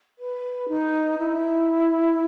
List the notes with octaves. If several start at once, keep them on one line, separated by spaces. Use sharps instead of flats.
B4
D#4
E4